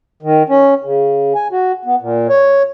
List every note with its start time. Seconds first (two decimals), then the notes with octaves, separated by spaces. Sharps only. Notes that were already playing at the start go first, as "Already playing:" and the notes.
0.23 D#3
0.49 C#4
0.84 C#3
1.35 G#5
1.52 F#4
1.85 B3
2.02 A#2
2.29 C#5